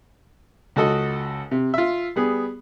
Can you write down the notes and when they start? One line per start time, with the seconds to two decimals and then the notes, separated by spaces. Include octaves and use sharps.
0.76 C#2 F#4 A4 D#5
1.51 C3
1.74 F4 E5
2.16 G3 B3 G#4